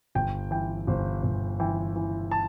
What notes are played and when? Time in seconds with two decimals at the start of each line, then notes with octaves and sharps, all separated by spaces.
0.15 G1 G5
0.51 E3 G5
0.87 G1 C5
1.23 G1
1.60 E3 G5
1.96 E3
2.31 A5